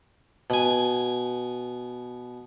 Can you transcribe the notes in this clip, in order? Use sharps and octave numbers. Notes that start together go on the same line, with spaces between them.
B2 G#5